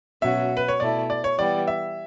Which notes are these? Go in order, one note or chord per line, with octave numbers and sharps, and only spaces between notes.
B2 F#3 C#4 F#4 E5
B4
C#5
B2 A3 E4 D5
D5
C#5
E3 G3 B3 D5
E5